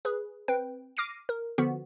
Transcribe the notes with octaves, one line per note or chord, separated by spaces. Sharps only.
G#4 B4
C4 B4 G5
D6 F6 A#6 C7 D7 D#7
A#4
D3 F3 B3 F#4